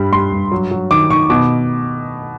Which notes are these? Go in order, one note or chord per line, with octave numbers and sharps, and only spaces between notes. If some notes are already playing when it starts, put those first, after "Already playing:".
Already playing: G2 G3 B5
G3 C6
G2
F#3
F#3
D#3 D6
D#3 C#6
B2 D6